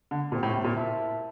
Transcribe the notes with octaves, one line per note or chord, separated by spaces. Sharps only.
D3
A#2 C4 E4 G4 C5 G5
A2
A2
A#2
E4 A#4 E5 A5